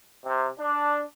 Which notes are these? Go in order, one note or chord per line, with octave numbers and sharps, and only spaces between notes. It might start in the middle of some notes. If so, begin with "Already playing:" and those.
C3
D4